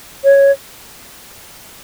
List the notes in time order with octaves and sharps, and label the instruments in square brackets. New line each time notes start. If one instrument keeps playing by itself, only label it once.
[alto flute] C#5